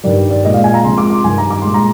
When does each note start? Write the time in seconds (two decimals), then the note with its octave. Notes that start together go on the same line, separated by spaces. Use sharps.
0.04 G2 D#3 G3 D5
0.31 D5
0.44 A#2 G#3 D#5
0.54 F5
0.64 G#5
0.74 A#5
0.84 C3 F3 G#3 C6
0.98 D6
1.10 C6
1.24 G2 D#3 G3 G#5
1.38 A#5
1.50 D6
1.62 A#2 G#3 C6
1.74 A#5